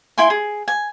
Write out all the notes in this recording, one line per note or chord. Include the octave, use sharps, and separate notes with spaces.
E4 G5 G#5 C6
G#4
G#5